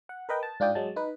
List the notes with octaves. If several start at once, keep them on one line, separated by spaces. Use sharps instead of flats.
F#5
A#4 B4 D#5 G5
A5
G#2 D4 F4 D5 G5 D#6
F#3 G#3 A5
D#4 B4